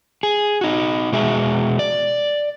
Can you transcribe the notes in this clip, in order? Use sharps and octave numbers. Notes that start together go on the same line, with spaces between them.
G#4
D#4 F#4
B2 G#3 F#4 G#4 E5
D5